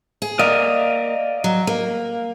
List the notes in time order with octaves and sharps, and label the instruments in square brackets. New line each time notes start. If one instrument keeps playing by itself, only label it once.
[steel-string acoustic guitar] G#4
[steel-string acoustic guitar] A#3 [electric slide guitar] D5 D#5 F5
[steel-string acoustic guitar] F#3
A#3